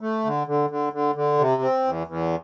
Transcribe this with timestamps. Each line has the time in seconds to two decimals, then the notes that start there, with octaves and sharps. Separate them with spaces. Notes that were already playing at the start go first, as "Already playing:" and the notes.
0.01 A3
0.25 D3
0.47 D3
0.70 D3
0.93 D3
1.15 D3
1.38 C3
1.62 C4
1.84 E2
2.07 E2